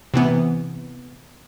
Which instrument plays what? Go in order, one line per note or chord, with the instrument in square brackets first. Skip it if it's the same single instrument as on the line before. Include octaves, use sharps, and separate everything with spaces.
[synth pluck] C3 E3 B3